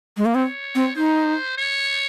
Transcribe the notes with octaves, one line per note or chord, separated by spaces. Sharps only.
G#3
A#3
C4 C#5
C4
D#4 C5
C#5